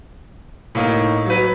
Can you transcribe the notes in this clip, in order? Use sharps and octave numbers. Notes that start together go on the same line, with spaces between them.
A2 A#3 D#4
F#3 B4